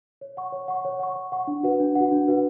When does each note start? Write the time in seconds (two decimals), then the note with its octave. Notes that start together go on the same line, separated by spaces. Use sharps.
0.21 C#5
0.37 F#5 C#6
0.52 C#5
0.68 F#5 C#6
0.85 C#5
1.00 F#5 C#6
1.16 C#5
1.32 F#5 C#6
1.47 D4
1.63 F#4 B4 F#5
1.80 D4
1.95 F#4 B4 F#5
2.12 D4
2.28 F#4 B4 F#5